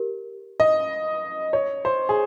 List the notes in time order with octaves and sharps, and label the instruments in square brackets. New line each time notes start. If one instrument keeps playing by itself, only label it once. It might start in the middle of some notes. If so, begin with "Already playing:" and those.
Already playing: [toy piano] G4 A#4
[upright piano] D#5
C#5
C5
G#4